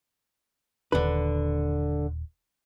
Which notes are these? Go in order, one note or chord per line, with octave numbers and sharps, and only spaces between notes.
D#1 D3 D4 B4